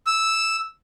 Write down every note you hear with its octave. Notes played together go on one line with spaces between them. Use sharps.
E6